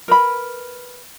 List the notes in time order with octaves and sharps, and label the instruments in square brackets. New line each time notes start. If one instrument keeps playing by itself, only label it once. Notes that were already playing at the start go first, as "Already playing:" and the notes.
[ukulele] A#4 B4 B5